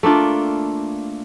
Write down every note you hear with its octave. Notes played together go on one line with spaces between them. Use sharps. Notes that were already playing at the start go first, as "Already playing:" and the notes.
A3 A#3 D4 F4